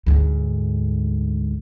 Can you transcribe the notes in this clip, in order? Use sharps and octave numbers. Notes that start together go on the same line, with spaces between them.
D2 G#2